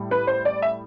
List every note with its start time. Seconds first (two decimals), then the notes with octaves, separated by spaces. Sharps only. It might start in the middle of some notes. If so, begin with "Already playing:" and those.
Already playing: A2 G3
0.11 B4
0.27 C5
0.45 D5
0.62 E5